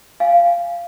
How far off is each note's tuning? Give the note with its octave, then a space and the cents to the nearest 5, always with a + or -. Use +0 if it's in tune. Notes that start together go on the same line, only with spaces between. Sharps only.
F5 -15 G#5 +0